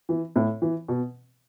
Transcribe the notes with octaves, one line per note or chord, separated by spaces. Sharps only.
E3
A2
E3
B2